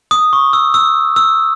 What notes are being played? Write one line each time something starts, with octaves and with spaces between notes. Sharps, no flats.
D#6
C#6
E6
E6
E6